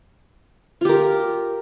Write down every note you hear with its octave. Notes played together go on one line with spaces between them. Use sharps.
F4 G4 A#4